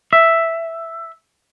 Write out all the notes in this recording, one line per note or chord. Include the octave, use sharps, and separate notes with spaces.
E5